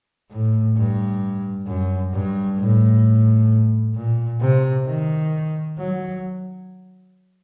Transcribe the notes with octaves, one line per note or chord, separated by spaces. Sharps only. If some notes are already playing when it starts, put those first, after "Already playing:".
A2
G2
F#2
G2
A2
A#2
C3
D#3
F#3